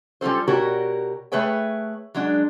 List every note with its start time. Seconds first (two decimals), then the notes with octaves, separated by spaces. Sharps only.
0.21 G3 C#4 F4 A4 C5
0.48 B2 F#4 G4 A#4 C#5 D5
1.32 A3 G#4 B4 C#5 G5
2.14 F#3 G#3 D4